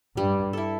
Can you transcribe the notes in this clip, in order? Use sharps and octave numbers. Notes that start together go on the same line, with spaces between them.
G2 G3
E4 A4